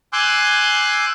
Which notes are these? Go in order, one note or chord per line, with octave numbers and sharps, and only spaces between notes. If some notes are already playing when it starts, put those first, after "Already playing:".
G#5 C6 D6 E6 F#6 G6